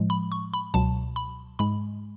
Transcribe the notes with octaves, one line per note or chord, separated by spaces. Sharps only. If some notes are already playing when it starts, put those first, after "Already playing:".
Already playing: A2 F3 G#3
B5
C#6
B5
C#2 B2 F#3 A5
B5
G#2 G#3 B5